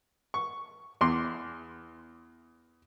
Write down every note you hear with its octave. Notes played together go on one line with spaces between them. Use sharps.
C#6
E2 C6